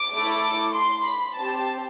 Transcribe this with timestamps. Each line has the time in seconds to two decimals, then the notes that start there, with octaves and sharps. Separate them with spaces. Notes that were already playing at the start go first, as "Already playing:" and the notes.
Already playing: D6
0.13 A3 E4 A4
0.75 C6
1.06 B5
1.37 C4 G4 A5